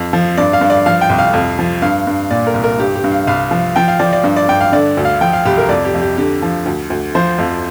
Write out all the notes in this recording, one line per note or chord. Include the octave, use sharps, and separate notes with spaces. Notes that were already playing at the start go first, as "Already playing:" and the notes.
Already playing: F2
F3
G2 D5
F5
G2
D5
F3 F5
G5
C2
F5
F2
F3
G2 F5
G2
A#2 D5
A#4
C2
A#4
G2 G4
G4
G2
F5
C2 F5
F3
F3 G5
F5
F3 D5
D5
G2
D5
G2 G5
F5
D3 D5
D2
F5
F3 G5
F5
C2 G4
A#4
F2 D5
G4
F2
G4
D3 G4
F3
D2
D2
F3 C5
F2